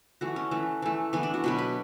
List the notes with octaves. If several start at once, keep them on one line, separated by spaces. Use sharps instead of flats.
E3 A3 F#4
C#4
E3 A3
E3 A3
E3 A3 B3
D4
F#4
B2 F#3 B3 B4
B4